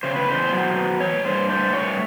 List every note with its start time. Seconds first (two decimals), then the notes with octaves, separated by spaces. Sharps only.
0.03 C#3 C5
0.16 B4
0.28 E2 C5
0.52 F#3
0.77 B3
1.00 E3 C#5
1.25 G2 C5
1.49 A3 C5
1.73 G2 C#5